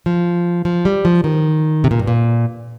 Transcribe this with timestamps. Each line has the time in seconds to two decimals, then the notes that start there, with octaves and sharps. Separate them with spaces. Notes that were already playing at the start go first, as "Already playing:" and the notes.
0.06 F3
0.65 F3
0.85 G3
1.05 F3
1.24 D#3
1.84 C3
1.91 A#2
1.99 G2
2.07 A#2